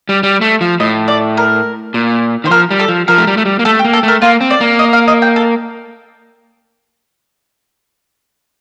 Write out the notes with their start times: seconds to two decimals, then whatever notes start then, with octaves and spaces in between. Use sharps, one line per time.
0.09 G3
0.23 G3
0.41 A3
0.61 F3
0.80 A2 D#5
1.08 D5
1.37 A#4
1.94 A#2
2.44 D#3 C5
2.50 F3 A#4
2.71 G3
2.80 A4
2.88 F3
3.08 F3 A#4
3.18 A3
3.27 G3
3.37 A3
3.45 G3
3.59 A#3
3.65 A3 A4
3.79 G4
3.85 A#3
3.93 A4
4.03 A3 A#4
4.22 A#3 F4
4.41 C4
4.50 D5
4.61 A#3
4.79 D#5
4.93 F5
5.08 D#5
5.22 G5
5.36 A4